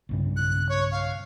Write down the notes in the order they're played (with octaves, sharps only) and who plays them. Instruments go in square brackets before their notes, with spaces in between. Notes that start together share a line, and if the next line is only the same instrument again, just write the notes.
[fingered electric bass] B1 G2 C#3
[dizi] F#6
C#5
F5